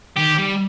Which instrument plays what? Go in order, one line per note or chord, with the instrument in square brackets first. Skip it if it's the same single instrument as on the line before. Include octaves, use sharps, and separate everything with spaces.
[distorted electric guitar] D#3 [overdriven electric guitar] G4
[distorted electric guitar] G3